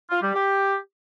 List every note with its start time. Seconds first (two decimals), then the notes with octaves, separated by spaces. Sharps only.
0.10 F4
0.22 G3
0.34 G4